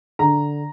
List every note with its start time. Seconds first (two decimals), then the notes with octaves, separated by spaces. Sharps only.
0.19 D3 A#5